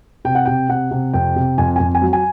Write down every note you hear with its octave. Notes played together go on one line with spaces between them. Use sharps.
C3 G5
F#5
C3 G5
C3 F#5
C3
F2 G5
C3
F2 G#5
F2 G#5
G#5
F#3
G#5